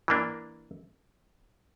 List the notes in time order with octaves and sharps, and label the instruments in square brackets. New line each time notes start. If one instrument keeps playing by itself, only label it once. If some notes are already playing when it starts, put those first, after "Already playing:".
[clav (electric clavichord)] E3 A#3 D4